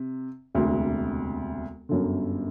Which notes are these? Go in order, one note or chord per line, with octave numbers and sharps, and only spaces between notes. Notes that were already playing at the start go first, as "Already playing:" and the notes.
Already playing: C3
E1 D2 C3
G1 F#2 D3